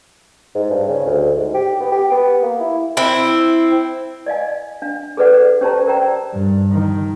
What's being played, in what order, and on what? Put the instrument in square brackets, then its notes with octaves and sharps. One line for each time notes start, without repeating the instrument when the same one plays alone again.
[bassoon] G#2
G2
C#3
D2
G#2
G4
B3
G4
B3
A#3
E4
[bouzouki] C4 E4
[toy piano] D5 D#5 F5 G#5
D4 F5
G#4 A4 B4 D5 F#5
C#4 G4 C5 D5 A5 A#5
A#4 C5 D5 G5 A#5
[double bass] G2
D#3